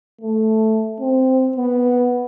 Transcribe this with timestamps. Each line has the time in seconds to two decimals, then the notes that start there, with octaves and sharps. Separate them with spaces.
0.21 A3
1.00 C4
1.56 B3